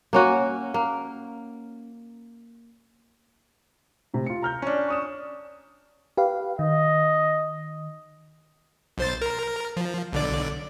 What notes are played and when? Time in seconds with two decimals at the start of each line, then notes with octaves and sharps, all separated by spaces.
0.13 A#3 C#4 F#4
0.74 A#3
4.14 A2 C3
4.26 F4 C#7
4.42 A#5 F6 G6
4.62 C#4 D4
4.88 C#6 D#6 E7
6.17 G4 B4 F5
6.59 D#3 D#5
8.98 B1 C5 A6
9.22 A#4
9.77 F3
10.13 B1 D3 D5